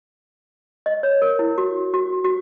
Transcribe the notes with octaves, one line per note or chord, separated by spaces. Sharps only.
D#5
C#5
A#4
E4
F#4
F#4
F#4